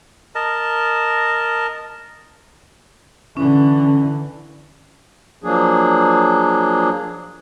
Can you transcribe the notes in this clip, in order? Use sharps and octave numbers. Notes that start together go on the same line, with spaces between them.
A#4 D#5 A5
D3 E3 C#4
F3 F#3 A#3 D4 G#4